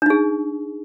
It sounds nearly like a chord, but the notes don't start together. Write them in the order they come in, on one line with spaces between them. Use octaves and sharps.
D4 D#4 G#4